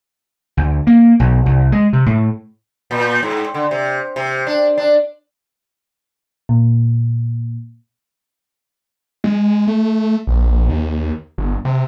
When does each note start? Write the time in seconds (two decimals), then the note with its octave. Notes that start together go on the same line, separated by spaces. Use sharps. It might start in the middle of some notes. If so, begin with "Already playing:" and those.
0.57 D2
0.87 A#3
1.20 B1
1.46 C2
1.72 G#3
1.93 C3
2.06 A2
2.91 A#2
3.23 G#2
3.54 D3
3.71 C3
4.16 C3
4.47 D4
4.78 D4
6.49 A#2
9.24 G#3
9.67 A3
10.27 A#1
10.69 D#2
11.38 G1
11.65 C3